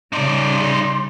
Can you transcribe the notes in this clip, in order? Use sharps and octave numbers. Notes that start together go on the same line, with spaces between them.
C#3 G3 D#4 D5 C6